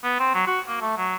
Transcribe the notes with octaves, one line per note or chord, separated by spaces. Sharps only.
B3
C4
F#3
F#4
A#3
A3
F#3